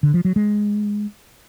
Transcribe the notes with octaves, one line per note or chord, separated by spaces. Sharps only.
D3
F3
F#3
G#3